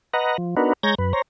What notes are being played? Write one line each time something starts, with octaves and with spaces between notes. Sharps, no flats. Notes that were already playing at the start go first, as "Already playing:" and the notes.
B4 D#5 F#5 A#5
F3
B3 D4 D#4 F#4 A#4 B4
G#3 C#5 A#5 G6 G#6 A#6
F#2 B4
C5 C#5 A#5